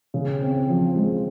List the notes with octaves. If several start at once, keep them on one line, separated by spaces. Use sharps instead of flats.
C#3
C4
F3
G#3